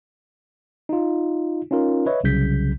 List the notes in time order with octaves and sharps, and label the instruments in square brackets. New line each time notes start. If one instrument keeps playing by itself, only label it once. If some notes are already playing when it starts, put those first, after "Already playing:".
[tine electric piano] D#4 F4
C#4 D#4 F4 A#4
B4 C#5 D#5 E5
C2 C#3 F#3 G6 B6